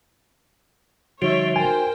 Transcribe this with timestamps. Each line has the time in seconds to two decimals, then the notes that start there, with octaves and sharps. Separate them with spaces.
1.22 D3 F3 G3 D#4 F#4 C#5 E5
1.56 A#4 C5 G5 G#5